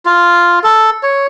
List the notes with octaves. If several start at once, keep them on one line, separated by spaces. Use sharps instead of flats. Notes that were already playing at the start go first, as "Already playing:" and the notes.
F4
A4
C#5